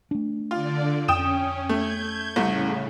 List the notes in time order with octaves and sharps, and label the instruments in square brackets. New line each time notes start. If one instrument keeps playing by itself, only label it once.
[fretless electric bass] A3 D4
[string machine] D3 D5 [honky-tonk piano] F4
[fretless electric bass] F2 [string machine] C#4 [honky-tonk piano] G5 D#6 E7
[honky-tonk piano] A3 [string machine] G6 G#6
[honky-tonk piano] C2 A3 [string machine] A2 C#3